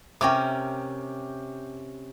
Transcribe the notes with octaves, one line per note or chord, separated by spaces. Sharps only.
C3 C#4 A#4 G5 D6